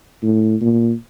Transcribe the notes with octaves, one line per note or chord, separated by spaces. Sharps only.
A2
A#2